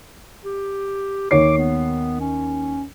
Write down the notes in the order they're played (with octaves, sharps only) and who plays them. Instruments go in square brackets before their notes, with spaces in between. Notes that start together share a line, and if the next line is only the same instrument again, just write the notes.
[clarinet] G4
[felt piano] D#2 C#5 C7 [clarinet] D6
[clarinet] B3
C#4